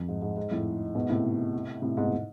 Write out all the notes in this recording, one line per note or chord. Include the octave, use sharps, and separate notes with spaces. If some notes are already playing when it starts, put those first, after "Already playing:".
Already playing: F2
G#2
G#2
G#2
F2 A2
G#2 B2
A2 C3
A2 C3
G#2 B2
A2